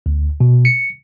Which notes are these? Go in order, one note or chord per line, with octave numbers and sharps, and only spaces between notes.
D2
B2
C#7